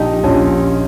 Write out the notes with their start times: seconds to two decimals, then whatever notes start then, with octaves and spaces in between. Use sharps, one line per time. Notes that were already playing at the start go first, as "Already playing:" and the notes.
Already playing: A#1 D#4 G4
0.23 A#1 C#4 F4